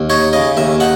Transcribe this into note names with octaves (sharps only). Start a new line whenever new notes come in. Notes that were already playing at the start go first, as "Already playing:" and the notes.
Already playing: D#2
D#4 C#5
C#3 D#5
D#2 E5
D#4 F#5